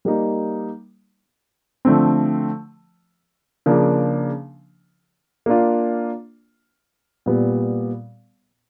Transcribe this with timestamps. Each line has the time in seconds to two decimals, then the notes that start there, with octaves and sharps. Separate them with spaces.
0.05 G3 A#3 D#4
1.85 D3 F3 A3 C4
3.66 C#3 F3 A#3 D4
5.46 A#3 D4 F4
7.26 A#2 G3 B3